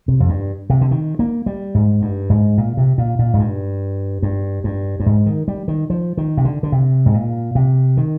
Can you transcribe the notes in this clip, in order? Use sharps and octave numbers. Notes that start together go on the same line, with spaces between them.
C3
F2
G2
C3
D3
D#3
A#3
G3
G#2
G2
G#2
A#2
C3
A#2
A#2
G#2
G2
G2
G2
G2
G#2
D#3
G3
D#3
F3
D#3
C3
D3
D3
C3
G#2
A#2
C3
D#3